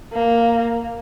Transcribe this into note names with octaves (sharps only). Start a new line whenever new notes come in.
A#3